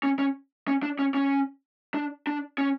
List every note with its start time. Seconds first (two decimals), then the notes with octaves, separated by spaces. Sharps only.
0.03 C#4
0.19 C#4
0.68 C#4
0.83 D4
0.99 C#4
1.14 C#4
1.95 D4
2.27 D4
2.58 C#4